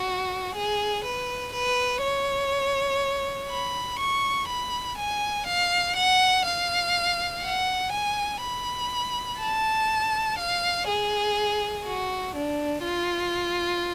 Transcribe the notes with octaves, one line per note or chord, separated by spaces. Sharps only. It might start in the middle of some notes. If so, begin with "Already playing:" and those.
Already playing: F#4
G#4
B4
B4
C#5
B5
C#6
B5
G#5
F5
F#5
F5
F#5
G#5
B5
A5
F5
G#4
F#4
D4
F4